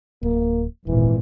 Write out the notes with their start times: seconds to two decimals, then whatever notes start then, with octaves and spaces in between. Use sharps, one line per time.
0.23 D1 A#3
0.87 D#1 G#1 A#2 E3